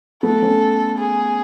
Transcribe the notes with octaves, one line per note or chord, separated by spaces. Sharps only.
A3 B3 A4
B3 C#4
G#4